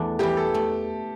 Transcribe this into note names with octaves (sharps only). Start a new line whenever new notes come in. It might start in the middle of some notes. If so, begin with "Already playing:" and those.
Already playing: E2 A3 D4
E3 G3 E4 G4
A4
A3